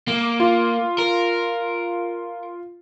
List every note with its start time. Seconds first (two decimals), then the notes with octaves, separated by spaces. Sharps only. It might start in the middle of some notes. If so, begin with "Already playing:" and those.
0.08 A#3
0.40 F4
0.98 A#4